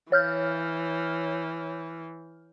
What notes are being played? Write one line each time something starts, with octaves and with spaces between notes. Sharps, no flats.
E3 C#5 F6 G6